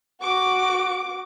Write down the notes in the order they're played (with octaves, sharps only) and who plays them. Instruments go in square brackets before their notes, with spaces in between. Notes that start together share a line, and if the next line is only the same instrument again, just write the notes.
[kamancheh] F#4 D6